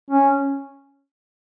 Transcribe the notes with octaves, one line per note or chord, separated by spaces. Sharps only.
C#4